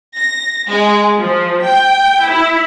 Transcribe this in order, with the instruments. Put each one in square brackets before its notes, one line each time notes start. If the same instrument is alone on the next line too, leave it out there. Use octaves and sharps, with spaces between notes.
[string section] A#6
G#3
F3
G5
E4